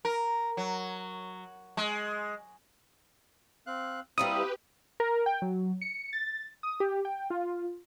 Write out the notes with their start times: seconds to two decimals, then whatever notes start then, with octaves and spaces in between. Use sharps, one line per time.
0.05 A#4
0.57 F#3
1.77 G#3
3.67 C4 F5 F#6
4.18 G3 A#3 C4 E4 G4 B4 D#6
5.00 A#4
5.26 G5
5.42 F#3
5.81 C#7
6.13 A6
6.63 D#6
6.80 G4
7.05 G5
7.30 F4